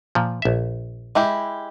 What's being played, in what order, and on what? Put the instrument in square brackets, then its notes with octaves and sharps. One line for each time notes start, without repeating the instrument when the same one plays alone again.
[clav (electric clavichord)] A#2 F3
A#1 E5
[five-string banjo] G#3 E4 G4